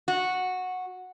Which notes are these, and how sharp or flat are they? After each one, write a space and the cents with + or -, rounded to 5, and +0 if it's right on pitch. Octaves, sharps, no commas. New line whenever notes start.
F#4 -10